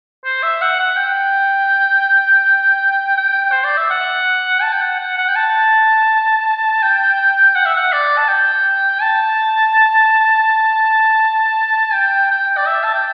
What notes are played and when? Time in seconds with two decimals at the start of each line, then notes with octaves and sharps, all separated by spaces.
0.25 C5
0.43 E5
0.62 F#5
0.79 F#5
0.97 G5
3.17 G5
3.52 C5
3.64 D5
3.77 E5
3.90 F#5
4.62 A5
4.73 G5
4.82 F#5
5.00 F#5
5.18 F#5
5.29 G5
5.36 A5
6.83 G5
7.56 F#5
7.66 E5
7.76 F#5
7.93 D5
8.18 A5
8.29 G5
9.02 A5
11.94 G5
12.31 G5
12.57 D5
12.67 E5
12.84 A5
12.94 G5